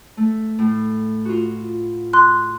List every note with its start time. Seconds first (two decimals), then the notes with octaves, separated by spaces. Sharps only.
0.17 A3
0.59 A2
1.25 F4 F#4
2.13 C6 F#6